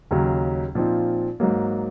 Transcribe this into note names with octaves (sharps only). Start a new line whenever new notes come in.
D#2 C#3 F#3
A#2 F3 C4 D#4
G#2 F#3 A#3